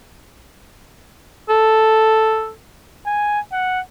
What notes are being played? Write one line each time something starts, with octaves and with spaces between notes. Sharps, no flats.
A4
G#5
F#5